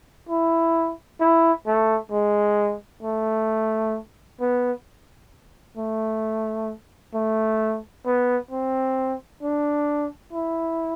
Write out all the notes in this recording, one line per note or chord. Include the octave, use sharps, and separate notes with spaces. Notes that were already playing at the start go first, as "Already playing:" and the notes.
E4
E4
A3
G#3
A3
B3
A3
A3
B3
C4
D4
E4